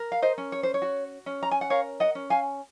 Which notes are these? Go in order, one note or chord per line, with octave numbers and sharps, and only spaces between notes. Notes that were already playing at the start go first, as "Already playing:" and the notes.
Already playing: A#4
F5
C5 D#5
C#4
C#5
C5
C#5
F#4
C#4
A#5
G#5
F#5
A#4 C#5 F5
D#5 F#5
C#4
F5 G#5